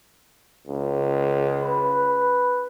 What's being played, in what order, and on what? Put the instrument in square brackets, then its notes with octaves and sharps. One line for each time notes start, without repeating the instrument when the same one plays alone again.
[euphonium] C#2
[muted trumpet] B4